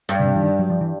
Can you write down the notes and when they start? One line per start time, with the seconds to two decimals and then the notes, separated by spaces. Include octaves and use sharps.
0.09 G2
0.20 C#3
0.25 C3
0.36 E3
0.42 D#3
0.59 F#3
0.70 F3
0.81 E3